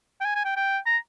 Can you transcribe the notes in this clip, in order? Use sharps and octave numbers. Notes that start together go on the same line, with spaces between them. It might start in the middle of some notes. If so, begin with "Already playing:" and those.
G5
G#5
G#5
G5
G5
A#5